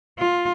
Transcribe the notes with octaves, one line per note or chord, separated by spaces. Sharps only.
F4